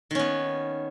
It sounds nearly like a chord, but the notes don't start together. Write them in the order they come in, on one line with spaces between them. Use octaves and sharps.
D#3 C#4 B3